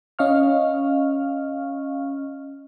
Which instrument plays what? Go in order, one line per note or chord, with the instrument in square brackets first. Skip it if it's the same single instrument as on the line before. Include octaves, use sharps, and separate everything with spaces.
[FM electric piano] C#4 D#5 F5 C#6 F6